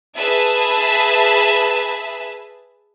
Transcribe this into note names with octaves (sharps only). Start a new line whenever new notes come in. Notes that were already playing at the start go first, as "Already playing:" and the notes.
G#4 B4 E5 A5